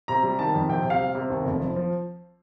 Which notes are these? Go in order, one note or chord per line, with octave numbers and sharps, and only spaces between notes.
C3 A#5
G3
D#3 A5
F2
C3 G5
C3
F5
G3
C3
D#2
F1
F3
F3